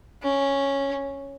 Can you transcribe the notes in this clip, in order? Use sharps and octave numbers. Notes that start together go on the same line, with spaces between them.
C#4